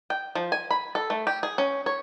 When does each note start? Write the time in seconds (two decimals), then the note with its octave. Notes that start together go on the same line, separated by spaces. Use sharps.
0.10 G5
0.35 F3
0.52 G#5
0.71 B5
0.95 A4
1.10 A3
1.27 G4
1.43 G#4
1.58 C#4
1.86 C#5